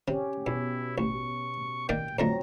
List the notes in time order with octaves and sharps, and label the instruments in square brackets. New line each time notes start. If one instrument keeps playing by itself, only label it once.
[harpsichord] C3 [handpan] C#4 G4
[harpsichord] E2 [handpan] B2 [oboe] E4
[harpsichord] A1 [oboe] C#6
[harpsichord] D#3 A#3 D5 [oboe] G5
[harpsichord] F2 D3 A3 [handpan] F#3 C4 [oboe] A#5